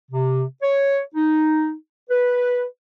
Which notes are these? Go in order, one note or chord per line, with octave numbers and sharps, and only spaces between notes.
C3
C#5
D#4
B4